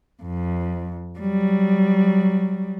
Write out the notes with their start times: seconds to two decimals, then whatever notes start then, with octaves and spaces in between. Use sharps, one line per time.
0.23 F2
1.19 F#3 G3